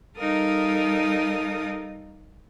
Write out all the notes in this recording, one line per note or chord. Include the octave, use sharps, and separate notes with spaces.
G3 D#4 A4 A#4 F5 D#6